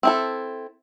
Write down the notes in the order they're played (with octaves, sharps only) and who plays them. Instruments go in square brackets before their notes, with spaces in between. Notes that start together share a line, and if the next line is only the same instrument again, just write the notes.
[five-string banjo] C4 E4 A4